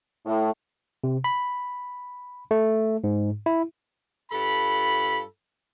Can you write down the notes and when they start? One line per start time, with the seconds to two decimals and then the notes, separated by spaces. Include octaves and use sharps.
0.26 A2
1.04 C3
1.24 B5
2.51 A3
3.04 G#2
3.46 E4
4.31 G2 F4 A4 B5